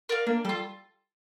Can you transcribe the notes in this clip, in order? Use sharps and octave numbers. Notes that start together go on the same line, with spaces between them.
A#4 D5 F5
A#3 D4
G3 F4 A4